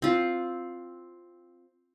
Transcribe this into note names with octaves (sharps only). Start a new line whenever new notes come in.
C4 F4